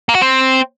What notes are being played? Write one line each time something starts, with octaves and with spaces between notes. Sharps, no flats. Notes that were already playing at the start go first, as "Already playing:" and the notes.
A#3
F#4
C4